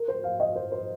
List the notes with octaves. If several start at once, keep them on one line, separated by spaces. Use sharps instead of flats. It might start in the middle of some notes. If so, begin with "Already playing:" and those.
Already playing: A#4
C5
F5
D#5
C5
C5